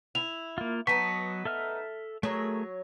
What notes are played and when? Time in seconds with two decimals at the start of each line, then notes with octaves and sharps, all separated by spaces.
0.15 E4 F7
0.58 A#3 F4
0.87 F#3 B3 D#4 A5 C#6 B6
1.45 A4 E5 F6
2.23 F#3 A3 G#4 A#4 C#5